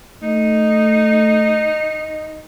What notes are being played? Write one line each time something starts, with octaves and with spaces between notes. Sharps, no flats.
A3 D#4